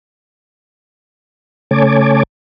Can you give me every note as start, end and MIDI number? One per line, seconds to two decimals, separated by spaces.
1.71 2.23 49
1.71 2.23 57
1.71 2.23 73
1.71 2.23 80
1.71 2.23 81
1.71 2.23 86